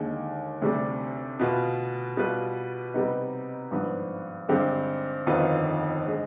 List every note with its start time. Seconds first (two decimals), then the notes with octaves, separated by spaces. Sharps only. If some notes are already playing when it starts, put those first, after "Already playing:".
Already playing: D#2 D3 G#3
0.62 D2 C3 G3 D4
1.39 B2 B3 F4
2.17 B2 G3 B3 F4 B4
2.94 C3 G3 B3 D#4
3.71 G#1 G2 F3 B3
4.48 G2 D3 G#3 C4 G4
5.26 G1 F2 D#3 B3 F4
6.06 D3 G#3